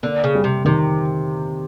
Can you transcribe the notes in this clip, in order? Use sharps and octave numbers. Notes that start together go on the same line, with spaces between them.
D3 A#3
C#3
G3
C3
C3 D#3